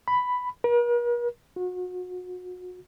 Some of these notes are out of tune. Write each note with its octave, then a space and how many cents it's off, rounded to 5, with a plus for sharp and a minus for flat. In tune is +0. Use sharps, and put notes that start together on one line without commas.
B5 +5
A#4 +45
F#4 -35